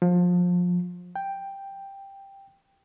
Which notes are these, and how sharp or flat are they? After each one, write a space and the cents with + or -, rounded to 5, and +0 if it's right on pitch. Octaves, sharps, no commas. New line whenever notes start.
F3 +25
G5 +5